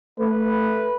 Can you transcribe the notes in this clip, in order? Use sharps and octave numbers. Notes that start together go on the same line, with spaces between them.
A3 B4